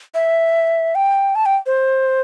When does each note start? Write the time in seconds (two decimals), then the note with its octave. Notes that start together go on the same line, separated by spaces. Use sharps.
0.14 E5
0.95 G5
1.35 A5
1.46 G5
1.66 C5